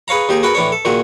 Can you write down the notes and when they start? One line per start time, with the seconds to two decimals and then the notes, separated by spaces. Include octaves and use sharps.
0.08 G#4 B4 C#5 F5 A#5
0.29 D#2 D#4 G4 G#4
0.43 F#4 G#4 A#4 B4 F#5 B5
0.55 A2 E3 D4 C#5
0.72 A4
0.85 A#2 D#3 F#4 G#4